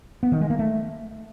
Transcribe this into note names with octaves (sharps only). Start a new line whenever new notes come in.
B3
D#3
G#3
A#3
A3